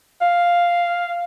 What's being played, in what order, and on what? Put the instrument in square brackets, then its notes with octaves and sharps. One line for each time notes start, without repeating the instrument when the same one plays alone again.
[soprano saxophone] F5